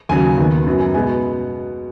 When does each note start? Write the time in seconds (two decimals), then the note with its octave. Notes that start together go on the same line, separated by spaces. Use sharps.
0.09 D#2 C#3 F#3 G#5
0.38 D#2 D#3 B3
0.67 F#2 F#3 B3
0.80 G#5
0.94 B2 G#3 B3 G#5